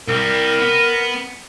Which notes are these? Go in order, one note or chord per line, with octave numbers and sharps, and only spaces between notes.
C2 G3 A#4
B3